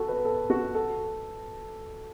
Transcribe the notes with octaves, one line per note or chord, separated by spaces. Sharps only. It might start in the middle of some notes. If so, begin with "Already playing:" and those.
Already playing: F#4 A4
B4
A4
F#4
A4